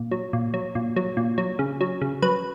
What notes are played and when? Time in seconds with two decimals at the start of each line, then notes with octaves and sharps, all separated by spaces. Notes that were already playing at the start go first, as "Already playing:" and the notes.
Already playing: A#2
0.11 F#3
0.33 A#2
0.54 F#3
0.75 A#2
0.96 F#3
1.17 A#2
1.38 F#3
1.59 C#3
1.81 F#3
2.02 C#3
2.22 F#3 B4